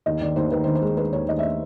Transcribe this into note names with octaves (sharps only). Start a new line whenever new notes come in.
D#2 D#5
D#3 D5
D#2 C5
D#3 B4
C5
D#3
C5
G#3
G#3 B4
D#2 C#5
D#2 D#5
E5
D#5